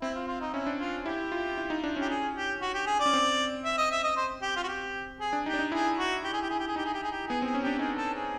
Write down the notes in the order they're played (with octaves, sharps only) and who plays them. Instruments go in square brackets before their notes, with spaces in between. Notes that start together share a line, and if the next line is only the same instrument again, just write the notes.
[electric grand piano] C4 [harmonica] E4
[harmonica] F4
F4
D#4
[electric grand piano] C#4 [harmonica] E4
[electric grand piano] D4
[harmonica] F4
[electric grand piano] E4 [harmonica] G4
[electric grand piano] F4
E4
D#4
D4
[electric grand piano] C#4 [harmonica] G4
[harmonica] G#4
G4
F#4
G4
G#4
D5
[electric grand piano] C#4
C4
[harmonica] E5
D#5
E5
D#5
C5
G4
F4
F#4
G4
G#4
[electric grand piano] D4
[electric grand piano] D#4 [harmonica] G4
[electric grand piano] D4
D#4
[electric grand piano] E4 [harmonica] G#4
[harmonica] F#4
G4
G#4
G4
G#4
G4
G#4
[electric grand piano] D#4 [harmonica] G4
[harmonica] G#4
G4
G#4
G4
[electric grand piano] B3 [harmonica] G#4
[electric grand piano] C4 [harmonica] G#4
[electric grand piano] C#4
[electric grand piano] D4 [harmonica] G4
[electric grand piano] D#4 [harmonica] G#4
[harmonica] A4
G#4